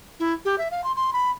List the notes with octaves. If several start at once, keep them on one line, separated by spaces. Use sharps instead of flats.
E4
G4
E5
F5
C6
C6
B5